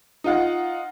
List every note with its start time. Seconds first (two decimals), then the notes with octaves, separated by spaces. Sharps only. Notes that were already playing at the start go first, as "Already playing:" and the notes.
0.24 D#4 F4 F#5